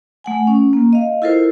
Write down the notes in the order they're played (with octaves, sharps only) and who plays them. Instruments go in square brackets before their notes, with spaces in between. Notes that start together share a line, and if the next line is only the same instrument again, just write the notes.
[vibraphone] A3 F#5 G#5
C#4
A#3
D#5 F5
E4 F4 A4 A#4 C5